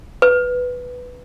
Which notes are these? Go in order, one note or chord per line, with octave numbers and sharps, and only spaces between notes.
B4